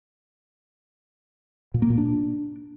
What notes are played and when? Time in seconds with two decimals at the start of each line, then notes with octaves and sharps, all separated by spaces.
1.74 A#2
1.82 A#3
1.90 A#2
1.98 D4